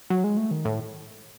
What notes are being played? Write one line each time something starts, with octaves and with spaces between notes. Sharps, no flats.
F#3
G#3
A3
D#3
A2